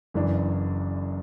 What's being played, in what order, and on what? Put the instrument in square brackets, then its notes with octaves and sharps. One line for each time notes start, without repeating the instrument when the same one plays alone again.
[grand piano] F#1 F#2 E3 D4